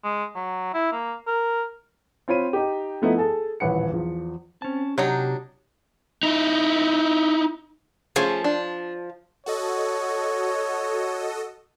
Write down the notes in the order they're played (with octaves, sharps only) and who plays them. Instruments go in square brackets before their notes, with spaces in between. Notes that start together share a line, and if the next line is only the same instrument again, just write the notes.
[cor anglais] G#3
F#3
E4
A#3
A#4
[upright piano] C4 F4 C5 C#5 B5 D#7
D#4 G4
F3 A3 B3 D#4 E4 E5
G#4 A4 A5
D#1 A1 B4 F#5 C#7
E2 F3
[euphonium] C4 [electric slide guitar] C#4 A5
[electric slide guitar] C3 [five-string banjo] F#3 D4 D#4 [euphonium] G4
[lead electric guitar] D#4 E4
[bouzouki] F3 [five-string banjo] A3 C#4 G#4
[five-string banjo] D4
[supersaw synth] F#4 A4 D#5 [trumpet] C#5